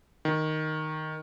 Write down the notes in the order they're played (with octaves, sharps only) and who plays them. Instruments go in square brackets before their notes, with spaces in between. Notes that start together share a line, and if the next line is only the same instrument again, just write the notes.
[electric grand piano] D#3